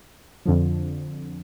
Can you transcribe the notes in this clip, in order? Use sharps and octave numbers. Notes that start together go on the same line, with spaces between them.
F2 D3 F3